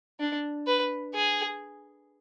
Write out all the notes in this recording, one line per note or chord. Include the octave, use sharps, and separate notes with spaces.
D4
B4
G#4